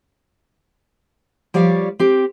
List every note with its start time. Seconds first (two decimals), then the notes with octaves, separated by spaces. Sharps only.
1.54 F3 G3 C#5 D5 F5
1.99 C4 G4